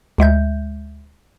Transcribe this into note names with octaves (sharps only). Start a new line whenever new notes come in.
D2 G#3 E5 G6